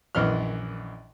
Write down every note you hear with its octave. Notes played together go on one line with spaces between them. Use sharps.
A#1 F#2 E3 D#5 F6